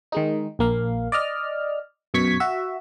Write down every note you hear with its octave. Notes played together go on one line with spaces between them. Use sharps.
D#3 G#3 D#4
A#1 A#3 F5
D5 D#5 F6
F#2 B2 C#6 G#6 B6
F#4 E5